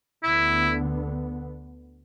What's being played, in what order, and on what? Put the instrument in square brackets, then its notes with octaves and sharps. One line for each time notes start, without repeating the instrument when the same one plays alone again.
[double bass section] D2 D3 B3 [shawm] E4